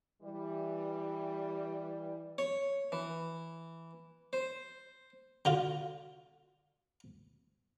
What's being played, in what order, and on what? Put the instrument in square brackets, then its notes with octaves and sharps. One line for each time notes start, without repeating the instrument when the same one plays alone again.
[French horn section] E3 G3
[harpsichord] C#5
E3
C5
D3 F4 F#4